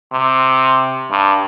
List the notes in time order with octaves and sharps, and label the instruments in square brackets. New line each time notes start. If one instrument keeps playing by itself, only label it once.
[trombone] C3
G2